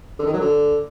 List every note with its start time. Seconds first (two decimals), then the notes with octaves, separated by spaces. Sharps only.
0.19 D3
0.26 D#3
0.33 F#3
0.40 D3